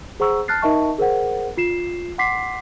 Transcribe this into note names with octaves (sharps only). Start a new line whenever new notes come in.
G#4 C5 F#5 A#5 C#6 E6
A5 F6 F#6 A6 C7
D#4 A#4 D#5 E5 A5 C#6
G#4 A#4 C5 F#5
F4 C7 E7
F#5 C6 D6 B6 C7